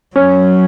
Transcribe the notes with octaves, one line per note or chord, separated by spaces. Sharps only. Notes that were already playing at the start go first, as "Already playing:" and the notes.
F#3 C#4